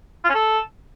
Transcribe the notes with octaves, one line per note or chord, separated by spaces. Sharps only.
F4
C#4
A4